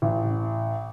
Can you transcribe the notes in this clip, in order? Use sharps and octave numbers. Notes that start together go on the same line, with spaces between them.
A1